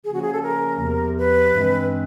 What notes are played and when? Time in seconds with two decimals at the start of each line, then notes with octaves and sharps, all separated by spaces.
0.04 C#3 F3 A#3 C#4 G#4
0.14 F#4
0.23 G#4
0.33 A4
0.42 A#4
0.79 E2 C3 F3
1.17 B4
1.54 G2 E3 G#3 C4